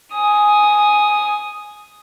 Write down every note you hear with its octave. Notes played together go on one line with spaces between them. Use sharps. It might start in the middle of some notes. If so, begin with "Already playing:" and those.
G#5 D#6